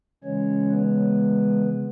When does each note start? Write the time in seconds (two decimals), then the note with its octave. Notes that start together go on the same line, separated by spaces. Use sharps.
0.24 C#3 E3 G#3 C#4 C#5
0.70 B3 B4